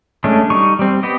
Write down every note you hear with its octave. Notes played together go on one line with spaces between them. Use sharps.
G#3 A3 C#4 D4
G3 D#4 C#6
G3 C4
B3 G4 D#5